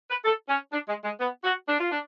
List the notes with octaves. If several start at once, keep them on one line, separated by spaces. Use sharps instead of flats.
B4
A4
C#4
D4
G#3
G#3
B3
F#4
D4
F4
D4